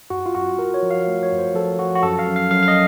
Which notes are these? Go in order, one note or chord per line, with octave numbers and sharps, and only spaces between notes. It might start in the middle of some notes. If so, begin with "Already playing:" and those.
F#2 F#4
F4
F#2 F#4
F#2 A#4
C#5
F3
F5
A3
C#5
F#2
C5
F3 A4
F3 F#4
F#4
F#2 A4
F5
F#2
F5
F#2 F5
F5
D#5